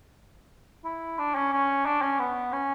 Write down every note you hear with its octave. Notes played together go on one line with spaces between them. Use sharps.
E4
D4
C#4
C#4
D4
C#4
B3
C#4